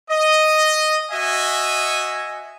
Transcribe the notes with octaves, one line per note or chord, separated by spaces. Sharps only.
D#5
F#4 D#5 E5 G#5